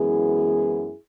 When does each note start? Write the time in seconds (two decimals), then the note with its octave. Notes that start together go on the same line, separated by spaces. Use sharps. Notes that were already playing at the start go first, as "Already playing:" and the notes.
Already playing: F#2 E3 G#3 B3 E4 G#4